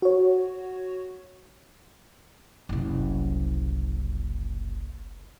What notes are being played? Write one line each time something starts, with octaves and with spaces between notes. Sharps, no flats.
F#4 C#5
F#1 C2